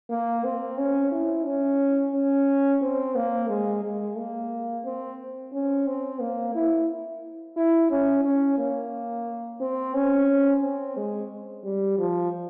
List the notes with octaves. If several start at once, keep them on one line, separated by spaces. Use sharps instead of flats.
A#3
C4
C#4
E4
C#4
C#4
C4
A#3
G#3
G#3
A#3
C4
C#4
C4
A#3
E4
E4
C#4
C#4
A#3
C4
C#4
C4
G#3
G3
F3